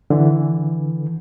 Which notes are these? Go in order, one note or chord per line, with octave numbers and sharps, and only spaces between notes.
D3 E3